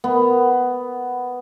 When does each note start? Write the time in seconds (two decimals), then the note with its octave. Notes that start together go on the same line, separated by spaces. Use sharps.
0.04 B3